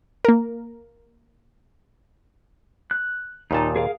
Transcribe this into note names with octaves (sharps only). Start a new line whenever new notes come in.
A#3 A#4
F#6
D#2 A#2 D#4 A5
G#4 A#4 F5